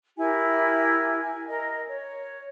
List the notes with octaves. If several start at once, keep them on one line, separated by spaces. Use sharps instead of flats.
E4 G4 A#4 G#5
G#5
A#4 D#5
C#5